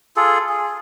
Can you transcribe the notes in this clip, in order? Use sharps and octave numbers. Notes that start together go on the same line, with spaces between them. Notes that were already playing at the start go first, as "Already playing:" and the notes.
F4 G#4 A4
G#4